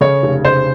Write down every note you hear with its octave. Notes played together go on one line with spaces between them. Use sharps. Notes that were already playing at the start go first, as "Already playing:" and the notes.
C#3 C#5
F1
C#3 C5